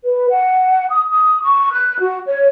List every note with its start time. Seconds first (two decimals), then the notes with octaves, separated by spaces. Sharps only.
0.04 B4
0.30 F#5
0.90 D#6
1.09 D#6
1.42 C#6
1.73 F#6
2.00 F#4
2.27 C#5